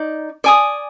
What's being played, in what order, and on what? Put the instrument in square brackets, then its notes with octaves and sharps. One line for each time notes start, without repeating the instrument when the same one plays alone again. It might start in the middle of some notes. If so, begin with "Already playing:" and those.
Already playing: [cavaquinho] D#4 D5
D5 G#5 D#6